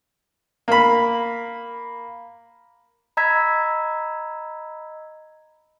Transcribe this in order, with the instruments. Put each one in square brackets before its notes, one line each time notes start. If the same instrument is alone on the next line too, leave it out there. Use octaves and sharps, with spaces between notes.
[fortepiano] A#3 B5
[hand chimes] D#5 A#5 B5 E6 G#6 B6